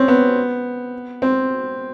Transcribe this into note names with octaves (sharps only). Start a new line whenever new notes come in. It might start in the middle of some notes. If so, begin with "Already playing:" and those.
Already playing: C4 C#4
B3
C4